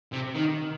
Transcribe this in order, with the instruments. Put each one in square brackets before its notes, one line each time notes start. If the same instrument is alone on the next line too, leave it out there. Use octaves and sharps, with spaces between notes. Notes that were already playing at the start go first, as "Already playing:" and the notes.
[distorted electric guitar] C3
D#3